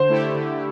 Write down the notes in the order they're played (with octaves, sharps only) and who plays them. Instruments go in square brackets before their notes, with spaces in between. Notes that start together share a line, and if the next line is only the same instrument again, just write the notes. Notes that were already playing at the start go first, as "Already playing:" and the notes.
Already playing: [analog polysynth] D3 [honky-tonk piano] C5
[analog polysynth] A3 E4 G4
D3